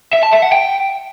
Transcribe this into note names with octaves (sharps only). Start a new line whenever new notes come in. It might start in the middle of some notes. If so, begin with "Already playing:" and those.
E5
A5
E5
F#5
G5